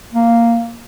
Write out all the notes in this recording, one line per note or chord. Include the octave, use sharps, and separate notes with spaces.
A#3